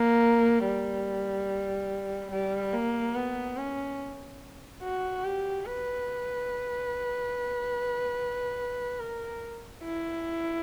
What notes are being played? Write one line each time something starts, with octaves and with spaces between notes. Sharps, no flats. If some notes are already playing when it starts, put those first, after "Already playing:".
Already playing: A#3
G3
G3
A#3
B3
C#4
F#4
G4
B4
A#4
E4